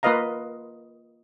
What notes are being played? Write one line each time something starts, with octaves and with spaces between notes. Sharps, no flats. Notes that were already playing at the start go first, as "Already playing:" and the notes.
A#3 F4 B4 D#5 F5 A#5